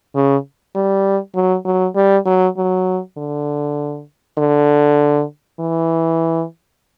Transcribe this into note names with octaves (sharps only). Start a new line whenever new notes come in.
C#3
G3
F#3
F#3
G3
F#3
F#3
D3
D3
E3